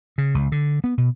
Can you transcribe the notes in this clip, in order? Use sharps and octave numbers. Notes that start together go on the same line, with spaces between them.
C#3
C#2
D3
B3
B2